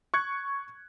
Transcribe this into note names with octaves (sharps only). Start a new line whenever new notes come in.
C#6 F#6 G#6 C#7